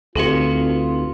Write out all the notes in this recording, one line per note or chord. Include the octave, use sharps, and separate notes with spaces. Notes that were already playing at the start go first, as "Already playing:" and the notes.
D2 C4 D#4 F4 G4 A4 B4